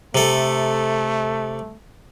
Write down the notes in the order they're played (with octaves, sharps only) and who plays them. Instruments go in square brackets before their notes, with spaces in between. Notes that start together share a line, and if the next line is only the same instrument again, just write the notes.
[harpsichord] C3 A4 [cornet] A3